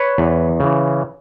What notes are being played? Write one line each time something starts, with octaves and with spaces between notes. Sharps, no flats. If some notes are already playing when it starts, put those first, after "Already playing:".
Already playing: B4 C#5
E2
C#3 E3